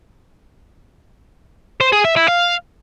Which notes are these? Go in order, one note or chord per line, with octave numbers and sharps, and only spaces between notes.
C5
G#4
E5
E4
F5